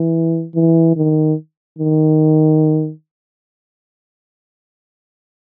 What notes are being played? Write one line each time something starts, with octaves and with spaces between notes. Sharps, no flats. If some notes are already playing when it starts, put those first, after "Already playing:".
Already playing: E3
E3
D#3
D#3